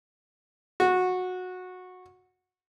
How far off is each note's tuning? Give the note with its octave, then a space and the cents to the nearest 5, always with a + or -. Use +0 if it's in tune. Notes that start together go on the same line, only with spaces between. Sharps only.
F#4 -15